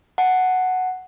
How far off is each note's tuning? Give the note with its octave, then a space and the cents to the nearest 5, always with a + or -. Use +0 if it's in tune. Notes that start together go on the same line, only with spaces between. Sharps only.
F#5 +0 A5 +0